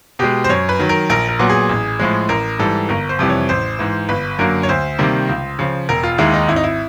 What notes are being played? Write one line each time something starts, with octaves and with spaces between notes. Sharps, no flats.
B2 G#3 G4
C5
F#2 C#5
B4
D#3 F#3
A#4
A#1 A#4
A#4
A#2 F#3 B3
G#4
A1
A2 F3 G#3
A1 A#4
G#2 E3 G3 A4
G1 A#4
C5
F2 C3 E3 G3
C#5
A1 C5
G#2 E3
G1 B4
F#2 D3 F#3 A#3 A#4
C#5
D2 C5
C3 D#3 G3 A#3
C#2
C#3 F3
E1 A#4
F4
D#2 D#3 G#3 E4
D#4
G#1 E4
D#4
E4